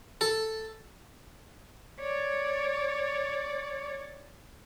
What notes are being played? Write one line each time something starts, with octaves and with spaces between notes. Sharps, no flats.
A4
C#5 D5